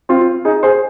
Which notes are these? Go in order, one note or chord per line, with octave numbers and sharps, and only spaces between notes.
C4 F4
D#4 G#4
G#4 C5